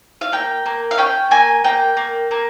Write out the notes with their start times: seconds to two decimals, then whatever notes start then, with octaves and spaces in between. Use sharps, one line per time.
0.21 F5
0.32 A#3 G5
0.66 A#3
0.91 F5
0.98 C#4 G5
1.31 A#3 G#5
1.64 A#3 G5
1.97 A#3
2.31 A#3